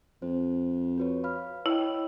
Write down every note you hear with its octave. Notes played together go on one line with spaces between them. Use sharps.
F2 C5
F#4 B4 C#5
F5 B5 F6
E4 C#5 D#5 G5